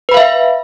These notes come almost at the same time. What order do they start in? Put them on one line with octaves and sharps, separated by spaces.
B4 B5 F5 E5